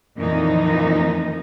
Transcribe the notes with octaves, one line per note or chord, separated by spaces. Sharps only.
F2 A#2 D#3 E3 C4 D#4